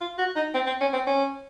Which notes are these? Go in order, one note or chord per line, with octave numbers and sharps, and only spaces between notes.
F4
F#4
D#4
C4
C4
C#4
C4
C#4